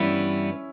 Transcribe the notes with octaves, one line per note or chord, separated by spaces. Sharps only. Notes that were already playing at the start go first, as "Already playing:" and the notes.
Already playing: G2 E3 G3 B3 C#4 E4